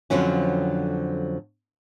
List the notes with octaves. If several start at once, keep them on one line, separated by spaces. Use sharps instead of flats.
F2 D3 F3 F#3 C#4